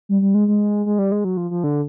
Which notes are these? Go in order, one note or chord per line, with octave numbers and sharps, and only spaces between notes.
G3
G3
G#3
G#3
G#3
G3
G#3
F#3
F3
F3
D3